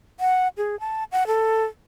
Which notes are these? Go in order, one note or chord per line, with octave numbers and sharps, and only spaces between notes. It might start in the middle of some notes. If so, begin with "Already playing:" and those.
F#5
G#4
A5
F#5
A4